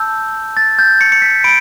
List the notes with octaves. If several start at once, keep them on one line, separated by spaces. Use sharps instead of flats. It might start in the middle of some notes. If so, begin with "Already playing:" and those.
Already playing: A5 E6 G6
A6
G6
C#7
C#7
B6
B5 D7